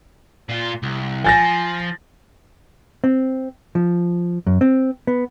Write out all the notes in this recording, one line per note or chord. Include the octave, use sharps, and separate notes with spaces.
A#2 F4
C2
F3 G#5 A6 A#6
C4
F3
F#2
C4
B3